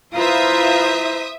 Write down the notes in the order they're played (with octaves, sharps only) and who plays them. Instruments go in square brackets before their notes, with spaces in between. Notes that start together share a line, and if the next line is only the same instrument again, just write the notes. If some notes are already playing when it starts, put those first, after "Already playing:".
[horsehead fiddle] E4 C5 [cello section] F4 B4 [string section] E5 D#6 [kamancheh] A#5